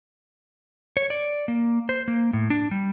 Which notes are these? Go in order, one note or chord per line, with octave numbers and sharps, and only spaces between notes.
C#5
D5
A#3
C5
A#3
A2
D4
G3